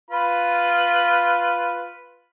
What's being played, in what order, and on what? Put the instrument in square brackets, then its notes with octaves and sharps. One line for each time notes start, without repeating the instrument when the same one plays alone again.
[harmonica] F4 B4 B5